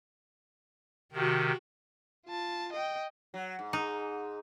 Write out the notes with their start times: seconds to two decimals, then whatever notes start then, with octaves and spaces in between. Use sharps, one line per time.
1.13 C3 D#3 F#4 G4
2.26 F4 A5
2.72 D#5 G5
3.34 F#3
3.59 G#2
3.73 D#4